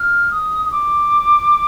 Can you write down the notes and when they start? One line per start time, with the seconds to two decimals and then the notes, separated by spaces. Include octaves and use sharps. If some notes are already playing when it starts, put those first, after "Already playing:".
Already playing: F6
0.31 D#6
0.66 D#6
0.72 D6